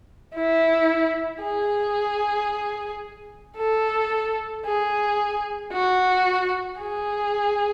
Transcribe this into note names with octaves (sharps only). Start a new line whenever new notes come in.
E4
G#4
A4
G#4
F#4
G#4